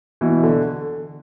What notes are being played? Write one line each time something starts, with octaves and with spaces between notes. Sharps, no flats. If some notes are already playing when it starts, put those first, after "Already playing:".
B2 E3
D3